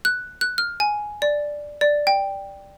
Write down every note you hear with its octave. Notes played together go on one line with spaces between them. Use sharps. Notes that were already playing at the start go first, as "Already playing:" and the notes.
F#6
F#6
F6
G#5
D5
D5
G5